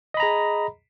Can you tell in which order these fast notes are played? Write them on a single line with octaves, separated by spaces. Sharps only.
D#5 B5 A#5 G#4